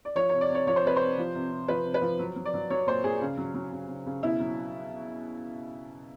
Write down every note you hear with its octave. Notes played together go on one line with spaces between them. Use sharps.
D5
F3 C#5
C3 C#5
D5
C3 C#5
F3 C#5
C5
C3 B4
C3 C5
F3
C3
C3
F3 B4
C3
B4
F3
F#3
F#3
D5
F#3
F#3 C#5
A#2 C5
A#2 G#4
C#3
F#3
F#3
C#3
C#3
C#3
B2 E4
F#3